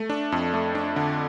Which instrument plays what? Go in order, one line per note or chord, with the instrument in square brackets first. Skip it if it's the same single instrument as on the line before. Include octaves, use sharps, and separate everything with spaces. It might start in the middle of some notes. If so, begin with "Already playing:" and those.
Already playing: [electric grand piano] A3
D4
F2
A3
D4
D3